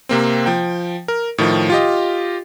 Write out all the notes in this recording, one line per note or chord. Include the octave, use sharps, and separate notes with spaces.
C3 A#3 C4
F3 G5
A#4
A2 D#3 F3
F4 G4 D#5